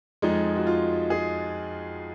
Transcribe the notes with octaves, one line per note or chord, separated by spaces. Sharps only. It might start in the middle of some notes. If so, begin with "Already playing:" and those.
F2 F3 G#3 D#4
F#4
F4
G#4